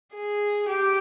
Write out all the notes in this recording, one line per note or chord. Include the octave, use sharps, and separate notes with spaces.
G#4
G4